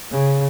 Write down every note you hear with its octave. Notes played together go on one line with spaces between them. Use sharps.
C#3